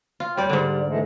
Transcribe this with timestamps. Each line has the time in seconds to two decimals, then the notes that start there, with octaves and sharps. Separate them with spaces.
0.20 F4
0.37 F2 G3 C#5 D5 G5
0.49 G#2 D3 G3
0.86 E3 G#3 A3